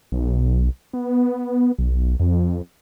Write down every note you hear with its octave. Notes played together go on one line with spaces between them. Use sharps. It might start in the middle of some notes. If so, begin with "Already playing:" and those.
B1
B3
B1
F2